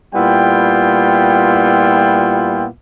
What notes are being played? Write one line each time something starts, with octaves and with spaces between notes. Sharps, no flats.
A#2 G3 B3 E4 F4 G5